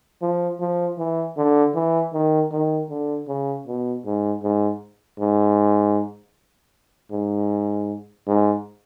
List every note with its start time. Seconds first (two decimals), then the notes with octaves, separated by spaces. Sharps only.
0.22 F3
0.60 F3
0.98 E3
1.37 D3
1.75 E3
2.13 D#3
2.52 D#3
2.90 D3
3.28 C#3
3.67 B2
4.06 G#2
4.43 G#2
5.19 G#2
7.12 G#2
8.27 G#2